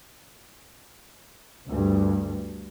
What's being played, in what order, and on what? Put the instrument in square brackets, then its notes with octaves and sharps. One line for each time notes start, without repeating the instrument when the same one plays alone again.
[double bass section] D2 G2